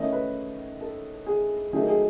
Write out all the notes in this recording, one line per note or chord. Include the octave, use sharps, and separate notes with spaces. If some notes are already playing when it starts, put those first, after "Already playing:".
Already playing: D#3 A3 C#4 E4 D#5
B4
A4
G#4
D#3 F#3 A3 D#4 G#4
G#4